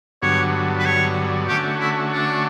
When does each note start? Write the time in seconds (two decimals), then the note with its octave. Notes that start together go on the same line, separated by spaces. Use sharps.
0.22 G2 D3 F#3 B3 C#5
0.79 B4
0.86 C#5
1.48 D3 A3 C#4 F#4 G4
1.80 E4
2.12 D4